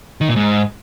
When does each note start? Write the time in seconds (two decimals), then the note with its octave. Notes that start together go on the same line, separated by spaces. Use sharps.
0.21 D#3
0.28 A#2
0.36 G#2